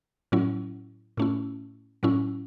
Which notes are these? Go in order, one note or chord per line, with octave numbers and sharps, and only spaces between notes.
A2 F#3 C#4 E4
A2 A3 C#4 E4
A2 F#3 C#4 E4